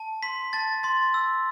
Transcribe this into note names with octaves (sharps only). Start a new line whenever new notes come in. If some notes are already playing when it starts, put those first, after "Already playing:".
Already playing: A5
C6 B6
A5 A6
C6 A6
E6